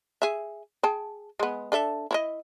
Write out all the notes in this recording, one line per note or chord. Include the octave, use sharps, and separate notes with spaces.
G#4 E5
G#4 G5 A5
G#3 B3
D4 A4 E5
E4 C#5 D#5